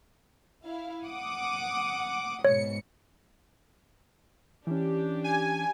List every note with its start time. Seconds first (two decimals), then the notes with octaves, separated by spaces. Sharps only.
0.65 E4 F5
1.06 F#5 D6 D#6
2.45 G#2 B2 C#5 C#7
4.67 E3 C#4 D4 G4
5.24 G#5